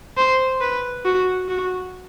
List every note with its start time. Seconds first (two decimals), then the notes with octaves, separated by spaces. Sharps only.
0.17 C5
0.61 B4
1.05 F#4
1.49 F#4